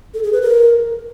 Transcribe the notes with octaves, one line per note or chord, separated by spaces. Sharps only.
A4
G#4
B4
A#4